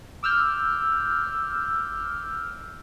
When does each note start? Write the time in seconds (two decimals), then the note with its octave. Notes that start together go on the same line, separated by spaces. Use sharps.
0.23 D6 E6 F6 G6